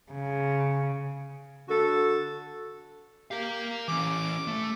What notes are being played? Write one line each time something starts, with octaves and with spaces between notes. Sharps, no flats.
C#3
D3 F#4 A4
G4 A#4 F5
E3 C#4 D6
A3